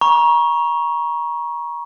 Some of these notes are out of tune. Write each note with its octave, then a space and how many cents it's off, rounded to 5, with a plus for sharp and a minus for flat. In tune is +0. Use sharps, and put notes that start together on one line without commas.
A#5 +30 C#6 +0